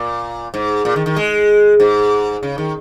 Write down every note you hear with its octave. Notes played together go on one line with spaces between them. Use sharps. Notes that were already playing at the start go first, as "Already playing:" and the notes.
Already playing: A#2
G#2
A#2
D#3
D#3
G#3
G#2
C#3
D#3